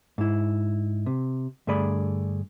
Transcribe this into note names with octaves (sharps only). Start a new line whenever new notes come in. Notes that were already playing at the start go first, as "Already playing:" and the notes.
G#2 E4
C3
G2 D3 A3 G#4 D5 B5